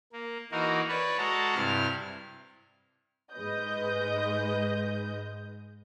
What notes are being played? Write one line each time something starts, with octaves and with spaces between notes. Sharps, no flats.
A#3
E3 A#3 D#4 F#4 A#4
B4 C#5 D5 B5
G#3 F#4 A4 A5 A#5
G2 C3 E4 F6
G#2 G#3 B4 D#5 G6